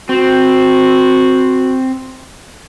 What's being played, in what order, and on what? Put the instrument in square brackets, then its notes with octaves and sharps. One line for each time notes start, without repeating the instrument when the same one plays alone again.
[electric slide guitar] C4 [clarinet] F#4